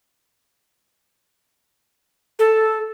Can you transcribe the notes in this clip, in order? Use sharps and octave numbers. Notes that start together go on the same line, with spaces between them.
A4